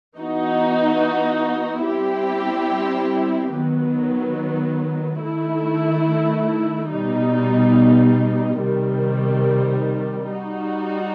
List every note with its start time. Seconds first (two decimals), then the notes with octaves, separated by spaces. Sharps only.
0.17 E3 B3 D#4 F#4
1.86 G3 C4 E4 G4
3.54 D#3 F#3 B3
5.23 D#3 A3 E4
6.92 B2 G3 D#4
8.61 C3 D#3 G3
10.30 G3 D#4 F#4